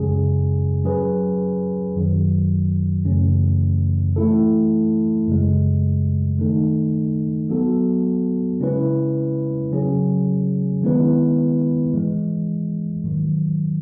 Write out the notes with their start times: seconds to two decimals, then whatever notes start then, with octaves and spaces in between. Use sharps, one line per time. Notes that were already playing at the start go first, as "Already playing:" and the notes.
Already playing: F#2 C#3 G#3 C#4 G#4
0.84 F#3 C#4 G#4 B4
1.95 F#2 D#3 F#3
3.05 F#2 C#3 E3 A3 C#4
4.16 E3 A3 E4 A4
5.28 F#2 C#3 G#3
6.38 D#3 A3 D#4 A4
7.49 F#3 B3 F#4 A4
8.60 C#3 G#3 C#4 E4 B4
9.71 C#3 F#3 C#4 G#4
10.82 D#3 G#3 B3 E4 B4
11.93 G#2 E3 G#3
13.04 G#2 D#3 F#3